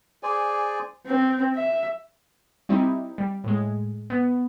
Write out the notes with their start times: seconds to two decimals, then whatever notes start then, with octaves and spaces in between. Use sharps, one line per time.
0.23 G#4 C5 D5 G#5
1.07 C4
1.55 E5
2.69 G3 C4 D#4 E4
3.18 G3
3.44 A2 G#3
4.10 B3